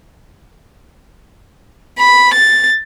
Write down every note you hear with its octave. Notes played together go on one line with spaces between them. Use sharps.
B5
A6